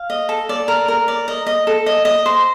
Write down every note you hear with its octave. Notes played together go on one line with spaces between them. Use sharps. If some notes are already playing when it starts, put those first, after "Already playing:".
Already playing: F5
D#5
A4
D5
A#4
A#4
D5
D#5
D#5
A4
D#5
D#5
C5